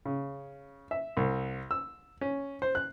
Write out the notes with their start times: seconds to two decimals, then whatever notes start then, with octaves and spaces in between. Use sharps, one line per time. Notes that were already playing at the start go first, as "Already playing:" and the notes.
0.06 C#3
0.91 E5
1.17 C2
1.71 E6
2.21 C#4
2.62 C5
2.75 F#6